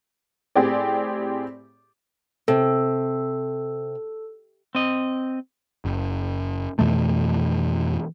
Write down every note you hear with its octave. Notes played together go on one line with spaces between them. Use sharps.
A2 C4 G4 G#4 D5
C3 A4
C4 D#5
F#1
F2 B2 E3 A3